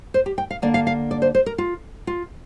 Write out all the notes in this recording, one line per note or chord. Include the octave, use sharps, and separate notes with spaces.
C5
G4
G5
F5
D3 A#3 D4 D5
F5
F5
D5
C5
C5
A#4
F4
F4